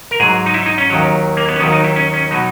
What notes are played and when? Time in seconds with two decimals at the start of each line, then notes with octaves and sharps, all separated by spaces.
0.11 A#4
0.20 G#2 F#3 G#4
0.46 D#4
0.54 E4
0.66 D#4
0.78 C#4
0.90 D#2 D#3 F#3
1.37 A#3
1.49 B3
1.56 C#4
1.60 D#2 D#3 F#3 B3
1.72 D#4
1.84 E4
1.96 C#4
2.13 C#4
2.31 B2 F#3 D#4